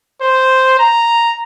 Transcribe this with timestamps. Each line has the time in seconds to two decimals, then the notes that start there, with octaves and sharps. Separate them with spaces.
0.22 C5
0.79 A#5